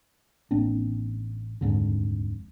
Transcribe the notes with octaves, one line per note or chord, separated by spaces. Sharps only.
A1 A#3 C4 D4
D#1 F2 G#2 D3